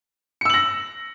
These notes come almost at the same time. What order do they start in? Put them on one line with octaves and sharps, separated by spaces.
C#7 E6 F#7 A#6